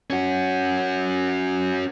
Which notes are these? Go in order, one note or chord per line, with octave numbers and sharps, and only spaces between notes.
C#4 F#4